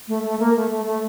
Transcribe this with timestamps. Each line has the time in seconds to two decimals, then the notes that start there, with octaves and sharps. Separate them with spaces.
0.08 A3
0.25 A3
0.40 A#3
0.56 A3
0.71 A3
0.87 A3